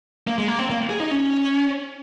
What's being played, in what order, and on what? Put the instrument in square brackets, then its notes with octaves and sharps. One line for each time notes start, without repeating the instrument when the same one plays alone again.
[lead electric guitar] A#3
G#3
A#3
C4
A#3
G#4
D#4
C#4